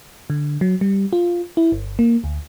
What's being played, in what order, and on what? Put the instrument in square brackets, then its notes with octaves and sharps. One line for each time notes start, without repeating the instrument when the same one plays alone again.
[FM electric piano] D3
F#3
G3
F4
E4
G1
A#3
D2